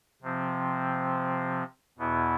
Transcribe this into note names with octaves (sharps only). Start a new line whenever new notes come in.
C3 F3 C4
E2 B2 B3 E4